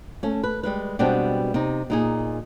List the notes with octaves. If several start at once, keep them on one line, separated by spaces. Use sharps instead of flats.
A3 C#4
B4
G3 G#3 B4
B2 G3 G#3 B3 C4 D4
C3 D#4
A#2 D#4 G#4